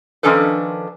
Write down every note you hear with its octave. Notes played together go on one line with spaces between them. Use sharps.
D#3 F3 C#4 D4 A4 B4